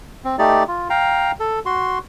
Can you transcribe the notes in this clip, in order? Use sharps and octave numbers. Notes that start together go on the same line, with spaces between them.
C4
A3 D#4 G4 D5
F4
F5 G5 A#5
A4
F#4 C6